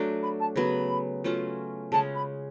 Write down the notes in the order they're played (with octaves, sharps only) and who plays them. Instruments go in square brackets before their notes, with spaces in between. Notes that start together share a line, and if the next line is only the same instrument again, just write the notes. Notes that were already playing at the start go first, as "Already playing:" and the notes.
Already playing: [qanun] F#3 A3 D4
[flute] B5
A5
[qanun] C#3 F#3 B3 [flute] B5
[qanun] F#3 A3 C#4 F4
[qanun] C#3 G#3 C#4 [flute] A5
[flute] B5